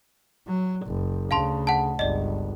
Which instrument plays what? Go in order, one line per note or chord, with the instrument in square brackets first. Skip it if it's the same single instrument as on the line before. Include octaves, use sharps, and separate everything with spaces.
[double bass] F#3
F#1
[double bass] D2 C#3 [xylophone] F5 A5 C6
[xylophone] F#5 A5
[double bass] G1 C#2 [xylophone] D5 D#5